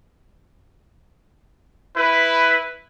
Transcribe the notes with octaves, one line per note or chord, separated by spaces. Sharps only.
E4 B4